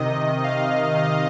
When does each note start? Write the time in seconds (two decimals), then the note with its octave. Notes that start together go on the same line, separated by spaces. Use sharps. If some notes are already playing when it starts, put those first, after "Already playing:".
Already playing: C3 D#3 D#5
0.44 F5